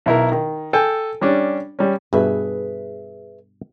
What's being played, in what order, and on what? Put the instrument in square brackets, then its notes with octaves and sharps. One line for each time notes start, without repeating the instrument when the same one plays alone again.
[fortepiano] B1 E4 A#4
D#3
A4 G5 G#5
G3 C#4 D4
G3 C#4
[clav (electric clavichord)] G2 B2 [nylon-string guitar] G#4 B4 E5